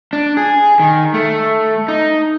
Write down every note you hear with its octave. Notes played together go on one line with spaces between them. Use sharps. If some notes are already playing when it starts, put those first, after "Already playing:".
D4
G#4
D#3
A3
D#4